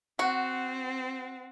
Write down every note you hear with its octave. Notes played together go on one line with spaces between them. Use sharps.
C4 F#4 F#5